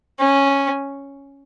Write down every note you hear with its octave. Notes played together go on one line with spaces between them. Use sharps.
C#4